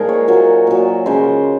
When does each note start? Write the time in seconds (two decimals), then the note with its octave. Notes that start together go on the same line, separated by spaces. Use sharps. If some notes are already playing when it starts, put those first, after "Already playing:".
Already playing: A#2 F3 G#3 D#4 G#4 A#4
0.09 C#5
0.28 A#2 F#3
0.67 A#2 F#3
1.06 C#3 F3 G#3 C5